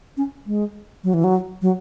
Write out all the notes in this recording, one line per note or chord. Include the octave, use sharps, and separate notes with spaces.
C#4
G#3
F#3
E3
F#3
F#3